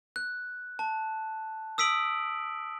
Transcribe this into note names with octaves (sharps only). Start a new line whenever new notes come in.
F#6
A5
D#6 E6 B6 D7 F#7